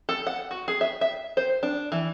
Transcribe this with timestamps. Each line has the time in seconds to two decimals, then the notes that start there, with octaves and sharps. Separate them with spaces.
0.09 A4
0.27 F#5
0.51 F#4
0.68 G#4
0.81 E5
1.01 E5
1.37 C5
1.63 D4
1.92 E3